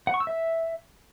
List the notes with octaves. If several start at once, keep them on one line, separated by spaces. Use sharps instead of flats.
F#5
C#6
E6
E5